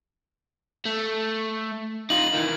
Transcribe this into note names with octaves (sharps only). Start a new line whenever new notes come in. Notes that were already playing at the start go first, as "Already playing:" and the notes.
A3
D#4 F4 F#7
D#3 E3